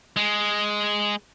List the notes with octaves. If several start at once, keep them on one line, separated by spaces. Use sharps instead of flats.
G#3